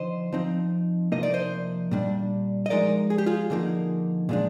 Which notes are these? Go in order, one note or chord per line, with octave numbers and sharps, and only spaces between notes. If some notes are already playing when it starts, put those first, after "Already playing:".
Already playing: D3 F3 D#4 C5 D#5
F3 C4 D#4
C3 F3 A#3 D#4 D#5
D5
C5 D#5
A#2 G3 D4
D#5
F3 G#3 D#4 A#4 D5
G#4
G4
F4 G#4
D3 F3 A#3 D#4
A#2 F3 G#3 D4